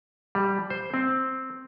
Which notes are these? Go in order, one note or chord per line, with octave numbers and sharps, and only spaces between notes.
G3
C5
C4